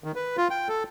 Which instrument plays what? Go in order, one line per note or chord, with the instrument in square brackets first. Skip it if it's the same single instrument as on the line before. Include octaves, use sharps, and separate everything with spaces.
[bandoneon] D#3
B4
F4
G5
A4